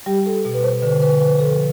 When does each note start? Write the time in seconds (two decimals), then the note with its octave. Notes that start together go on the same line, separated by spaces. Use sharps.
0.06 G3 G4
0.26 A4
0.45 B2
0.54 B4
0.63 C5
0.82 D3 B4
1.02 B4
1.20 F3 B4
1.39 A4